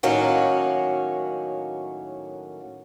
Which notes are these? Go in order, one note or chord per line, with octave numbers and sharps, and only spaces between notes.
A2 D#3 F#3 A#3 C#4 F#4